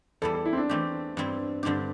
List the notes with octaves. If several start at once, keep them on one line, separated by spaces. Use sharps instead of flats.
E2 E3 G3 A4
A4
E4
C4
D4
E3 A3 C4 G4
G2 G3 C4 E4
G2 D3 C4 D4 G4